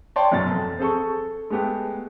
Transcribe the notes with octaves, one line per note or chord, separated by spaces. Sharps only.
C#5 D5 G5 A5 C6
F#2 B2 F#3 A6
F2
C4 G#4 A4 C#6
A4
G#3 A3 B3 G4